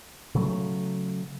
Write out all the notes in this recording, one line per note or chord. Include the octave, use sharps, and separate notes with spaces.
C#3 F#3 A3